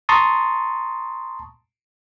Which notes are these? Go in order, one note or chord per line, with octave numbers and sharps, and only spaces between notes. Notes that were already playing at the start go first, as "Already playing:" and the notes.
A5 A#5 C6 C#6 D#6 A6